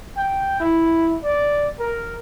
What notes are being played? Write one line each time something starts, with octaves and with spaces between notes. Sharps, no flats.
G5
E4
D5
A#4